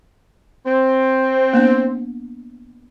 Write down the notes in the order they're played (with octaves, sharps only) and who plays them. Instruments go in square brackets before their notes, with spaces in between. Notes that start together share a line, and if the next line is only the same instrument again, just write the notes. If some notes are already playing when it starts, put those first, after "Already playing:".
[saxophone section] C4
[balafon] A#3 B3 D4